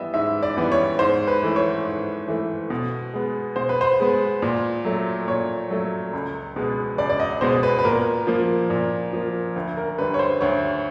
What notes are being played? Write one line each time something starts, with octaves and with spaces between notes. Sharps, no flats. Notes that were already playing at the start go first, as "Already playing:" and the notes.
Already playing: E3 G3 B3 D#5 E5
G#2 E5
D5
E3 G3 B3
C#5
G#2 C5
B4
E3 A3
C#5
G#2
E3 A3
B2
G#3 B3
B2 C5
B4
C5
G#3 B3
A#2
F#3 A3
A#2 C#5
F#3 A3
C#2
B2 G#3 B3
C#2 D5
D5
D#5
B2 G#3 B3 C5
B4
B4
A#2 A#4
F3 A#3
A#2
F3 A#3
D2
A#4
D3 G3 B4
C#5
C5
D2 C#5